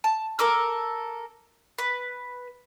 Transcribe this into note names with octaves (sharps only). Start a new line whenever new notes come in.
A5
A4 A#4 D6 E6
B4